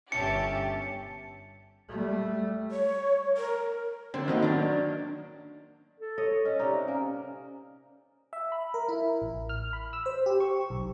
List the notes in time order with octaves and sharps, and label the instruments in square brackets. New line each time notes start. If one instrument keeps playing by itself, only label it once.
[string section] G1 C#4 G4 [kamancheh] E5 A5 [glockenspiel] C#7
[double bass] G3 A3
[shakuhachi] C#5
A#4
[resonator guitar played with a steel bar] D3 [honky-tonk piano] C4
[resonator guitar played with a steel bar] A2 F#4 D#5 [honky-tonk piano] D#3 A#3
[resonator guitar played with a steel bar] F#3 D4
[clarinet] A4
[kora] C#5 D#5
[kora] C#4 [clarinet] D#5
[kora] C3 D#4 [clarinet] D5
[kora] A#3 [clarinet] C#4
[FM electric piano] E5
B5
A#4
E4
A1
F6
B5
E6
C5
G4
C#6
B1